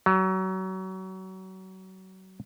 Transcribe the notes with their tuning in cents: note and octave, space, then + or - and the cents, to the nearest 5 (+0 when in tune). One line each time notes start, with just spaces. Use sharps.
F#3 +30